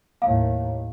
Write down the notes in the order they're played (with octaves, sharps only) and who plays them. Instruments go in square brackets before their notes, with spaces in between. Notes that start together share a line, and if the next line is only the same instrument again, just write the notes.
[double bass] D#2 A2 [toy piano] F5